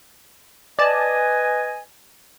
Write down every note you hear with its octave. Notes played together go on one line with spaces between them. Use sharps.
B4 D5 D#5 G#5 A5